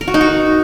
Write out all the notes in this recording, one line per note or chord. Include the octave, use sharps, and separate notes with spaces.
A#4
F#4
D#4
F#4